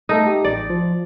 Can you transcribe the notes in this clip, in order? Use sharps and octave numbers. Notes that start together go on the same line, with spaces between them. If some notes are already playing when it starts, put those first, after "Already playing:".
A3 D#4 A4 D#6
G4
A1 D5
F3